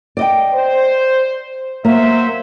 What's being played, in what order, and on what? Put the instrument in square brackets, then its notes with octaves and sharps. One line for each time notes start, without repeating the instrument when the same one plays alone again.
[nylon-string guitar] D5 D#5 G5
[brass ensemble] C5
[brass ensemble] F#3 C5 E5 [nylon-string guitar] A#3